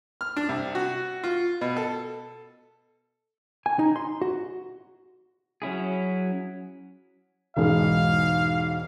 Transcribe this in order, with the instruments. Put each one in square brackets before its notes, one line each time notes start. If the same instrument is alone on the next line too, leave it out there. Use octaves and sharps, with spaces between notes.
[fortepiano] F6
D4
C2
F#4
F4
B2
A4
[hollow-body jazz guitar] G#5
D#4
C6
F#4
[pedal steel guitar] F#3 C#4 E4 G#4
[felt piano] E1 G#2 G#3 [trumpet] F5